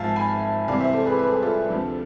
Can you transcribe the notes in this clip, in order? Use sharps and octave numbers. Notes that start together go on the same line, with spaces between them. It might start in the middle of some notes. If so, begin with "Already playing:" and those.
Already playing: G#1 G#2 F3 E5 F5 G#5 A5
G#5 B5
C2 C3 E3 D5 F5
C5 E5
A4 C5
G#4 B4
B4
A4
G#4
F4 A4
D2 C3 F3